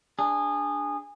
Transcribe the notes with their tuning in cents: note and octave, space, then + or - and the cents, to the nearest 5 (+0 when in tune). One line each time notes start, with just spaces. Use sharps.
D4 +0 G#4 -20